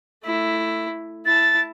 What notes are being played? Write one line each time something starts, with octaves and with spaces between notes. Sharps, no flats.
A3 E4
E4 A5 A6